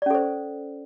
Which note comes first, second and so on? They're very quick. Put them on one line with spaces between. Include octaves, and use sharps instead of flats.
D5 C#4 A4 C5